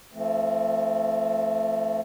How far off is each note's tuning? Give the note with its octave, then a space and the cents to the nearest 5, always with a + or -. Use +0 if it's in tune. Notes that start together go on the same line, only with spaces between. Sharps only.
F3 -40 A3 +0 C4 +0